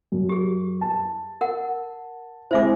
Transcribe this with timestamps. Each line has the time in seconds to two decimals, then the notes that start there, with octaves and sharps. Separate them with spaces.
0.12 F#2
0.29 G4 G#4
0.81 A5
1.41 A#4 F#5
2.51 G#3 C4 E4 C5 E5 D6